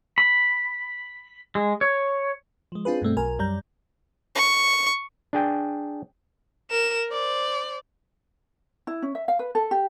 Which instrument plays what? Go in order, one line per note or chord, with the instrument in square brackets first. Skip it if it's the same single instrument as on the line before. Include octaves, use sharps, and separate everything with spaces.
[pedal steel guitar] B5
G#3
C#5
[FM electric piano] F3 G#3
C4 D4 F4 G#4 B4
G2 B2 A3 C4
B1 A#4 G#5
F#2 G3 D5 A#5 G6
[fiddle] C#6
[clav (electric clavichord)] D4 G#4 G5
[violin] A#4 E7
C5 D5
[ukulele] E4
C#4
E5
F5
B4
A4
G4